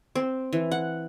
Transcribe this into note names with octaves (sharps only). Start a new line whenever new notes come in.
C4
E3
F#5